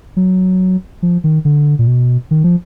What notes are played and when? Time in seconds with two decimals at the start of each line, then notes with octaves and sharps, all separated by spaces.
0.17 F#3
1.03 F3
1.24 D#3
1.45 D3
1.79 A#2
1.87 B2
2.31 D#3
2.44 F3